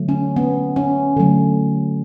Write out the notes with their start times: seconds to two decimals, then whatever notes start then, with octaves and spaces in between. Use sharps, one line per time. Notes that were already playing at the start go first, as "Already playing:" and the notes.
Already playing: D3 F#3 A3
0.09 C#4
0.36 B3
0.76 C#4
1.17 D3 F#3 A3